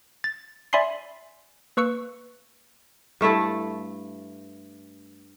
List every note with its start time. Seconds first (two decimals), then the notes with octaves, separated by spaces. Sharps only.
0.24 A6
0.73 D5 E5 G#5 B5 C6 C7
1.77 A#3 B4 C#6 E6 C#7
3.21 G2 A3 E4 A4